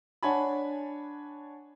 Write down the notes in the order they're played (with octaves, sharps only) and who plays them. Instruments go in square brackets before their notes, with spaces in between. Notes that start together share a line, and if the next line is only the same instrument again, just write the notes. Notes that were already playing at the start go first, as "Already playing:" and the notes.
[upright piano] D4 C#5 F#5 G#5 A5 B5